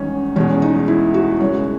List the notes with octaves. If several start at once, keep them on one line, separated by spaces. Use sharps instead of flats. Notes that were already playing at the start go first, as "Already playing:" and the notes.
Already playing: E2 D#3 G#3 C#4 D#4
E2 B2 G#3 C#4
D#4
E4
F#4
F#2 C#3 G#3 C#5